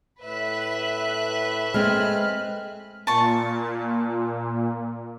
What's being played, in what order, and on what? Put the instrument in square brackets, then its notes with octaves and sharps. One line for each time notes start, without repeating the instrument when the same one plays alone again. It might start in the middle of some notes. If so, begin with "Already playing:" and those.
[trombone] A2 [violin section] B4 E5 F#6
[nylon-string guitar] G#3 C4 [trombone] A3 [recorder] F6
[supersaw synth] A#2 [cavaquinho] A5 C#6